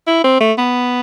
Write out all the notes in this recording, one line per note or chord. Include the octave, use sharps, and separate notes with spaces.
E4
C4
A3
B3